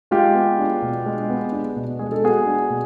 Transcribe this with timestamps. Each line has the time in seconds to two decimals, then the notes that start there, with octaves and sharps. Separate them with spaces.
0.11 G#3 F4 G4
0.35 B3
0.59 D4
0.82 B2
1.06 G#3
1.30 B3
1.52 D4
1.76 B2
1.99 G#3 G#4
2.12 A4
2.24 B3 F#4 G#4
2.46 D4
2.70 B2